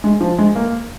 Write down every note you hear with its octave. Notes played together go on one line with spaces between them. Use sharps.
G#3
F3
G#3
A#3